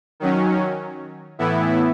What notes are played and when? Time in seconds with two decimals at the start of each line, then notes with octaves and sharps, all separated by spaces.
0.20 D#3 F#3 C#4
1.38 A2 E3 B3 E4